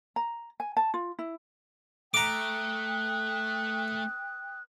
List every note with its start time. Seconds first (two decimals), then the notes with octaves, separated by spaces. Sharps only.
0.16 A#5
0.60 G#5
0.77 A5
0.94 F4
1.19 E4
2.14 A3 G5 A#5 D6 D#6 F#6